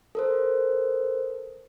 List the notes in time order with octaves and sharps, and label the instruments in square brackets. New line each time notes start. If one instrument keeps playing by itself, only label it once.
[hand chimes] A4 A#4 C5